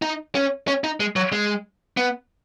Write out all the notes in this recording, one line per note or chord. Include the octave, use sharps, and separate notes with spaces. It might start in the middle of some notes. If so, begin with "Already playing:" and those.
D#4
C#4
C#4
D#4
G#3
F#3
G#3
B3